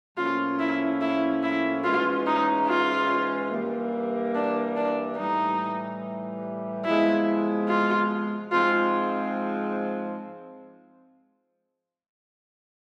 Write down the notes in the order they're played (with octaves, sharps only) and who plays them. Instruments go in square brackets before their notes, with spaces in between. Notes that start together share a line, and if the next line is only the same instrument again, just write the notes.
[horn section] A2 F3 A#3 C#4 [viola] F4
[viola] E4
E4
E4
[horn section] G#2 E3 G#3 C#4 [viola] F4
[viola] D#4
F4
[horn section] G2 E3 G3 A#3
[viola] D4
D4
[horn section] A2 E3 G3 [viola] D#4
[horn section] C3 F3 G#3 B3 [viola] E4
[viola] F4
[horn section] G#2 F3 G#3 C4 [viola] F4